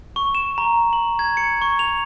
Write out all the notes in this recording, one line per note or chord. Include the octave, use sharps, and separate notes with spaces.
C#6
E7
A#5
F#7
G#6
C#7
C#6
F7